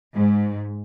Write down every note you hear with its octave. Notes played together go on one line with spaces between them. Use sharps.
G#2